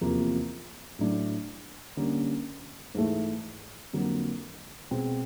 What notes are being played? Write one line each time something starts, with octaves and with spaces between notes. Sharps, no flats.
E2 C3 F3 A#3
A2 F#3 A3 D4
D3 G3 A#3 C#4
G#2 E3 A3
F2 D3 F#3 A#3
B2 G#3 C4